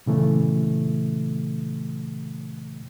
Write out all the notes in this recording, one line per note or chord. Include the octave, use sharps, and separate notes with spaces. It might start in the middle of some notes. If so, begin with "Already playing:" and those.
A#2 C#3 E3 A3